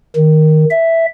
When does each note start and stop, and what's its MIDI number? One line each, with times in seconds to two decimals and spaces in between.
0.16 0.65 51
0.71 1.06 76